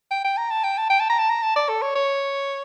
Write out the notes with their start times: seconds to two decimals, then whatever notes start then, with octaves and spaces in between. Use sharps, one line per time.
0.11 G5
0.24 G5
0.37 A#5
0.51 A5
0.64 G5
0.77 A5
0.90 G5
1.00 A5
1.10 A#5
1.19 A5
1.30 A#5
1.43 A5
1.56 D5
1.69 A4
1.82 C#5
1.95 C#5